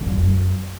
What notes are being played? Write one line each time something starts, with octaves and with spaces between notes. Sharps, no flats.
D3
G2
F2
F#2